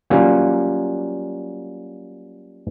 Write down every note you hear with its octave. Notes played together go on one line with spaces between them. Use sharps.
F#3 G3 A#3 C#4 F4